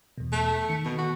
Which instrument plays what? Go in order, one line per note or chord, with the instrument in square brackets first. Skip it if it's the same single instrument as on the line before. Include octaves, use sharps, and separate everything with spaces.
[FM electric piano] E2 B2
[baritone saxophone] A3
[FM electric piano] D#3 C#7
[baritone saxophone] B2 [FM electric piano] D#3
[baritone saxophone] F#4